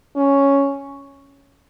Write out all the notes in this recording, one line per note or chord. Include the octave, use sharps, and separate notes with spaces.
C#4